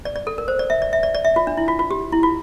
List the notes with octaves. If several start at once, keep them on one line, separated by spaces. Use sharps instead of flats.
D5
D5
A4
A#4
C5
D5
E5
D5
E5
D5
D5
E5
F4
D4
E4
F4
F4
G4
E4
F4